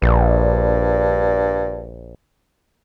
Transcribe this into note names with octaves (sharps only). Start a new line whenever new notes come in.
A#1 G2